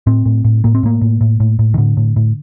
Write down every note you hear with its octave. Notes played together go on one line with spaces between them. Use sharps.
A2 C4
A2
A2
A2 A#3
C4
A2 A#3
A2
A2
A2
A2
D#3
A2 D3
A2
A2